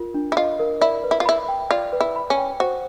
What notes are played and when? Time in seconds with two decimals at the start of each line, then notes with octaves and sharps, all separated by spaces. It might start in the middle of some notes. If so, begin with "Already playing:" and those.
Already playing: F4 A#4
0.14 D4
0.32 E4
0.37 F4 D#5
0.59 A#4
0.81 E4 D5
1.04 B4
1.11 E4
1.20 F4
1.26 E4 B5
1.48 G5
1.71 F4 D5
1.93 B4
2.01 E4
2.16 B5
2.30 C#4
2.38 G5
2.60 F#4 C5